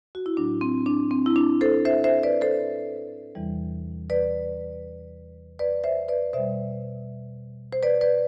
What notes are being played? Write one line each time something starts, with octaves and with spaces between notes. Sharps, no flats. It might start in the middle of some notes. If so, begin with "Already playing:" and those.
F#4
E4
A2 F#3 D4
C4
D4
C4
E4
D4
A4 C5
C5 E5
C5 E5
B4 D5
A4 C5
E2 C3 E3 G3
B4 D5
B4 D5
C5 E5
B4 D5
B2 G3 C5 E5
C5
B4 D5
B4 D5